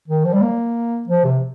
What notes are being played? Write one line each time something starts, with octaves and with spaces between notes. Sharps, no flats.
D#3
F3
G3
A#3
F3
C3